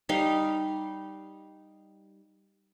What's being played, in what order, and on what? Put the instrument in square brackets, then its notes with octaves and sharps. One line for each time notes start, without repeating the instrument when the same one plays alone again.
[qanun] G3 D#4 F5